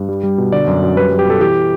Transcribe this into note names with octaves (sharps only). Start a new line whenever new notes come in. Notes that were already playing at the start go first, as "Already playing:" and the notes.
Already playing: G2
G3
G3
B2
D3 D5
F#2
F#2
G3 B4
G3
G4
B2 A4
E3 G4